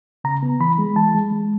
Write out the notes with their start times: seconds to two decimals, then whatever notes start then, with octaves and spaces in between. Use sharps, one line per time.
0.24 C#3 A#5
0.43 B3
0.60 E3 B5
0.79 G#3
0.96 E3 A5
1.15 G#3
1.33 G#3